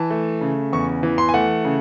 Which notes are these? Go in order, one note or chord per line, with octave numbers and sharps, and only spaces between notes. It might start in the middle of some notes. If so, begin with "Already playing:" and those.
Already playing: E3 A5
A3
C#3
E2 C#6
E3
C6
G#5
A3 F#5
C#3